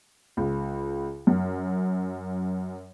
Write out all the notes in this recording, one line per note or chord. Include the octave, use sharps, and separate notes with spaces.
C#2
F#2